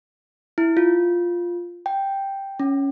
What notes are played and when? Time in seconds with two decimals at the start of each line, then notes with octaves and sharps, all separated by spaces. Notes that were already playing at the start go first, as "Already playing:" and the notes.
0.58 E4
0.77 F4
1.86 G5
2.60 C#4